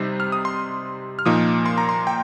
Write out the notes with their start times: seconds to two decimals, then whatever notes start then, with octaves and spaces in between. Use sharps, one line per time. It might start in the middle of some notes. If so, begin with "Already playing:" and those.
Already playing: C3 G3 D#4 C5
0.20 F6
0.32 D#6
0.45 C6
1.19 F6
1.25 A#2 F3 A#3 D#4 D#6
1.66 C6
1.78 A#5
1.89 C6
2.07 G5